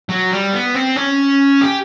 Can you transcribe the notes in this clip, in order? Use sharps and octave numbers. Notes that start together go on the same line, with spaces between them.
F#3
G3
B3
C4
C#4
G4